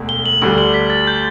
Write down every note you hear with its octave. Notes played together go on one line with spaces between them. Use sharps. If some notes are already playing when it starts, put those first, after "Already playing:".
Already playing: E1 D2
G7
F#7
D2 D3 G3 F#7
F#7
B6
A6
G6